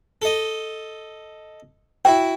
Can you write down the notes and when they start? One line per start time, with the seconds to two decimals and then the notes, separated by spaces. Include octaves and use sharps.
0.22 A4 D#5
2.05 E4 F#4 G5